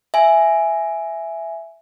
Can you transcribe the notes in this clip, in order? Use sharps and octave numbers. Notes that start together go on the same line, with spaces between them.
E5 G#5